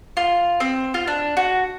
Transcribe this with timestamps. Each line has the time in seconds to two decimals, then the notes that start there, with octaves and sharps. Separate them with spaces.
0.17 F4
0.60 C4
0.94 F4
1.08 D4
1.37 F#4